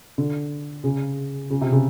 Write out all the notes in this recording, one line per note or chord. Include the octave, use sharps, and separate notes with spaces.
D3
C#3
C#3
C3
C#3